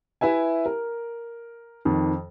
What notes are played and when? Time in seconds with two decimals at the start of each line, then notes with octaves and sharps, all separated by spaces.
0.21 E4 B4 E5 G#5
0.66 A#4
1.85 F2 D#3